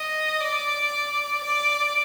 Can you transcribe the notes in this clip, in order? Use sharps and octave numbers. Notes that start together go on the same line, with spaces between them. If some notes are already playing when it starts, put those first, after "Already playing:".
Already playing: D#5
D5
D5